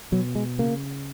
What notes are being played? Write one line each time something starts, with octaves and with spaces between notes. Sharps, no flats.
B2 F#3
G#3
C#3 A#3